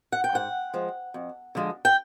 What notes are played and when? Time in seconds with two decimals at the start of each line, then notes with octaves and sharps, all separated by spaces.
0.12 F#5
0.24 G5
0.33 G#2 F#5
0.74 F3 G#3
1.14 F2
1.55 D3 F3 G#3
1.85 G5